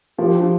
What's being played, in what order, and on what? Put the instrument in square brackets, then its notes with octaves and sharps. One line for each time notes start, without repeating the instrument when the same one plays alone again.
[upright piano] F3 [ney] G4
[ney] D4